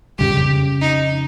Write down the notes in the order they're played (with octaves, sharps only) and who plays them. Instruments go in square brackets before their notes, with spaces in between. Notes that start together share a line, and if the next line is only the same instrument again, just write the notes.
[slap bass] F2 C#3 G3 [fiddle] G4
[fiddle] D#4